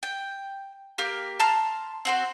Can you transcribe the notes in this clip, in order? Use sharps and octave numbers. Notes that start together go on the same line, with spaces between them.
G5
A#3 G4 F6
A5 A#5 C6 F6
C4 F#4 C5